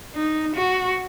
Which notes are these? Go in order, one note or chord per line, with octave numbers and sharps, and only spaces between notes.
D#4
F#4